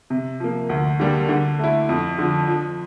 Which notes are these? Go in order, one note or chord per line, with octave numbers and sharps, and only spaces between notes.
C3
F3 A#3
D2
D3 G3 A#3
D3
A3 E4
F2
D3 F3
F3